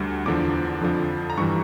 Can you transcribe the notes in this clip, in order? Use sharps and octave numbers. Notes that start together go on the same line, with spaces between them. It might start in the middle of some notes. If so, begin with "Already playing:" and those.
Already playing: D2 D3 G3
E2 D3 F3 D6
F2 D3 F3
A#5
G2 E3 G3 C#6